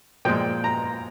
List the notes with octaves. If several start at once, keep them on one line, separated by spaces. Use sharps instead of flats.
A#2 F3 G#3 G5
A#5